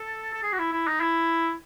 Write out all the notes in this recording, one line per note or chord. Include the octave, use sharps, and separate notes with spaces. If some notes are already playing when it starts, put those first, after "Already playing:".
Already playing: A4
A4
G#4
F#4
E4
E4
D#4
E4